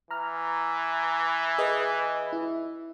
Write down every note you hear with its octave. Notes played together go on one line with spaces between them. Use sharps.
E3 A#5 F6
G#4 B4 D#5
E4